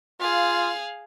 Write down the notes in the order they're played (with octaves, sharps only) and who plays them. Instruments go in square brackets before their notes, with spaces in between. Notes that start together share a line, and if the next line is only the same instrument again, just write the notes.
[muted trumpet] F4 [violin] G#4 F5